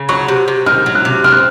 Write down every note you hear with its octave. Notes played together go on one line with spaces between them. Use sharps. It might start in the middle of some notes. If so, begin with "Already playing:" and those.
Already playing: C#3
F#3 C#6
C3
C3
D#3 F6
F#3
F#6
C3
C4 F6
F#6